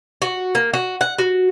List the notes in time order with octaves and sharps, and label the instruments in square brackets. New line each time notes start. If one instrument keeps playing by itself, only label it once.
[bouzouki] F#4
A#3
F#4
F#5
F#4